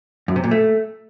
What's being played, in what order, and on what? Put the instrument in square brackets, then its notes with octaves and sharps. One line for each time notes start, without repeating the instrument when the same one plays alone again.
[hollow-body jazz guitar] F#2
C3
A#2
A3